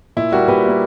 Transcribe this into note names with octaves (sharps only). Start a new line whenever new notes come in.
A#2 E4
G3 A#3 F#4
A#2 G4 B4
G3 A#3 E4